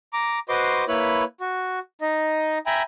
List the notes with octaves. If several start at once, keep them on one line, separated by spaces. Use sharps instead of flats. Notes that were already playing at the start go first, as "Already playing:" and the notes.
A#5 D6
F#4 B4 C5 D#5 C6 D6
A#3 E4 B4 C#5 B5
F#4
D#4 D#5
E5 G5 G#5 A#5 B5